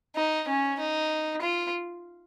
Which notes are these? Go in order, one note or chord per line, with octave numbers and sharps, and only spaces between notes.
D#4
C#4
D#4
F4